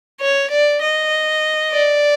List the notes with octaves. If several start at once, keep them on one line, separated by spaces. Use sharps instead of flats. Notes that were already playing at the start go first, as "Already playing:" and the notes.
C#5
D5
D#5
D5